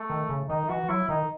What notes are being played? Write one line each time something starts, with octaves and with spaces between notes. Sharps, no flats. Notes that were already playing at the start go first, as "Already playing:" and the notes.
Already playing: A3
D#3
C#3
D#3 D#4
E3 F#4
F#3 E4
D#3 D#4